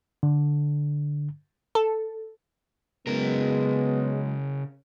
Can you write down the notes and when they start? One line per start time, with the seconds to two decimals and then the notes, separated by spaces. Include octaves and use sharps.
0.23 D3
1.75 A4
3.07 C#3 F#3 G#3 B3 A#4